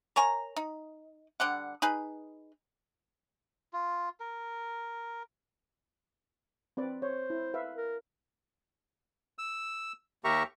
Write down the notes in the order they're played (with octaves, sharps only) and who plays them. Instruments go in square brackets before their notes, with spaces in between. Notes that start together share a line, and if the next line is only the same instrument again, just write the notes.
[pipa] A#4 C#5 G#5 A#5
D#4
D3 G3 F#5
D#4 G#4 B4
[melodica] F4
A#4
[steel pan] C4 B4 D5
[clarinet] C5 [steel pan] C#5
[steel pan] E4
B4 E5 F5
[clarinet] A#4
[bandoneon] E6
D#2 G4 A#4 E5 A#5 C#6